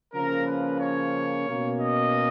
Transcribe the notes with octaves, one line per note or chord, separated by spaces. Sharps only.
C#3 F3 A#3 C#4 A#4
B4
C#5
B2 A#3 C#4
D#5